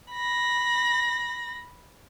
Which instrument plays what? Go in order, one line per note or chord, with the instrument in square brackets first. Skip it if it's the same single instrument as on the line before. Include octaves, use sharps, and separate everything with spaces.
[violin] B5 A#6